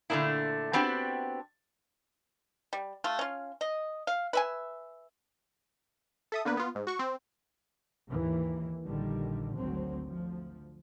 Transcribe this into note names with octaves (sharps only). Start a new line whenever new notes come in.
A#2 D3 A3 B3 D4 E4
B3 C4 D4 F#4 G4
G3
A3 F4
C#4 F4
D#5
F5
B4 E5 G#5
A4 E5 D#6
D3 A#3 B3 B4
B3 F4
G#2
F#4 C#6
C4
D#2 G#2 E3 A#3
A#1 D3 D#3 G3
G#1 D2 F#3 C4
D2 F3